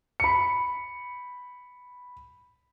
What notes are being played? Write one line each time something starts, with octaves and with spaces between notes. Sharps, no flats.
B5 C#7